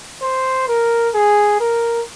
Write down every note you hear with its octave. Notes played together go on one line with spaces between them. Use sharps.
C5
A#4
G#4
A#4